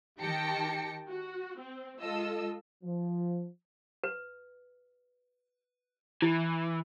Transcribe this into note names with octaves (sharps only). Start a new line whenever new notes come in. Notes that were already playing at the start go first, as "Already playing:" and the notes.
D#3 G4 G5 A5 A#6 C#7
F#4
C4
G#3 F4 A4 D#5 E6
F3
B4
E3 E4